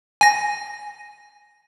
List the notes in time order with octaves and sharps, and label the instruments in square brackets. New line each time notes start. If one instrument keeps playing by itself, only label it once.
[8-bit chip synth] G#5 A#6